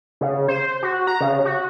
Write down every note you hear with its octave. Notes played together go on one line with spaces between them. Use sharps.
C#3
C5
F#4
A#5
C#3
F#4